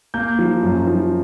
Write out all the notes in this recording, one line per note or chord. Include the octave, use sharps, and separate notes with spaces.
A#3 G6
F3
F#2
F3